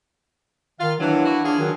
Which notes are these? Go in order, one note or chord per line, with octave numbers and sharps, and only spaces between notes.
D#3 F4 F5
E3 F#3 D4
E4 F#4
D4 F4 G#4
D#3 F#3